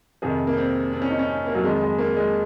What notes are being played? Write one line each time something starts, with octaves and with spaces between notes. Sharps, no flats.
F2 C3 D#3 G#4
A#3
C4
C4
C#4
D#4
C#4
A#3
F#3
F2 D#3 G#3
G#3
A#3
G#3